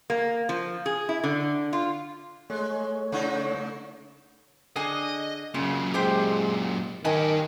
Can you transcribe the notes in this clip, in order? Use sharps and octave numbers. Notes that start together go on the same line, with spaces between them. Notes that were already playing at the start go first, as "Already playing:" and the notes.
A#3
F3
G#4
E4
D3
F4
G#3 A3 C#5
C#3 D#4 E4
D3 G#4 D#5 G#5
F#2 A#2 C#3
G#3 G4 C5 G5
D#3 G4 B4 D#5 G#5 A5